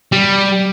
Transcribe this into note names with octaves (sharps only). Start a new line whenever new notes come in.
G3